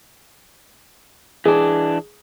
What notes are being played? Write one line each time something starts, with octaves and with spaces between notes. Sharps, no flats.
E3 D4 G#4